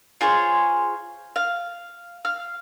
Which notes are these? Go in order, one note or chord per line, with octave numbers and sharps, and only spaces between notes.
F4 G#4 C5 C#5
F5
F5 F6